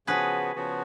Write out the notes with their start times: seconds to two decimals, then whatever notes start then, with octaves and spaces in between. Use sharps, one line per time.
0.07 C#3 F3 B3 F#4 G#4 B4
0.56 C#3 F3 B3 F#4